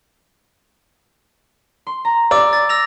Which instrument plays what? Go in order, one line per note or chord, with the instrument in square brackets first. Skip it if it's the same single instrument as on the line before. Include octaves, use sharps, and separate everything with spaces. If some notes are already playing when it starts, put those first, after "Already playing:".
[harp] C6
A#5
[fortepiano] D5 [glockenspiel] D6 E6
[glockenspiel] A6
E6 A#6 F7